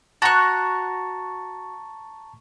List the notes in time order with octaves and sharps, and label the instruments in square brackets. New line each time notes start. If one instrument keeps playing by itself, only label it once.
[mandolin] F#4 F#6 [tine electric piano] A5 A#5 C#6